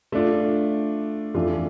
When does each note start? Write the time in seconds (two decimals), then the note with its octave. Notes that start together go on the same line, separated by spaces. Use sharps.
0.12 A3 D4 F4
1.35 F2 E3 A3 D4 F4